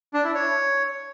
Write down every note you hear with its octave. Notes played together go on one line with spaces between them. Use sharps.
D4
E4
C#5